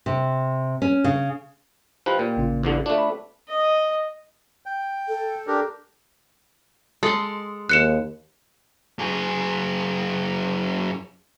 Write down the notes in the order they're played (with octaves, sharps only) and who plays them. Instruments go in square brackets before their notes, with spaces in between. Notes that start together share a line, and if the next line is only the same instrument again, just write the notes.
[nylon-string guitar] C3
C#4
C#3
[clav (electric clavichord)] F3 B4 [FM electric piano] D#4 G4 G5
[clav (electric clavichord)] A#2
[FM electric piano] A1 C#3 F4
[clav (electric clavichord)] E2 G2 D3
[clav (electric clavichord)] A3 D4 [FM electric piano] F4
[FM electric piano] B5
[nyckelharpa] D#5
[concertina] G5
[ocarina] A4
[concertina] D4 G4 A#4
[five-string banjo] G#3 [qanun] A4 C6
[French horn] D#2 [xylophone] F#6 C#7 E7
[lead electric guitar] F#2 G#4